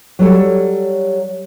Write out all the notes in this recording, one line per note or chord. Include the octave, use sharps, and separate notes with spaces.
F#3 G3 A4 C#5